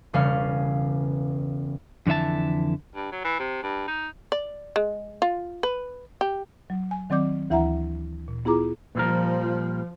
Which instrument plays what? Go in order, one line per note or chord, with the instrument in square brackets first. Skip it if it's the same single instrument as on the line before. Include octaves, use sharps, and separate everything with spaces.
[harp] E1 C#3 G3 C#4 F5
[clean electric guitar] F2 D3 E3 E5 A5
[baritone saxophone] G2
F#3
E3
C3
G2
D#4
[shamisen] D5
G#3
F4
B4
G4
[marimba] F#3
G#5
D#3 F#3 C4 D5 D6 G6
D2 E3 E4 E5 F#5 A#5
A#2
B3 E4 F4 G#4 A#5 D6
[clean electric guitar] A#2 G3 A#4 [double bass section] F3